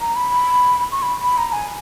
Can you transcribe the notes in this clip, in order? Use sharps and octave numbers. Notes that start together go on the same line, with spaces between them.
A#5
B5
C#6
B5
B5
A#5
G#5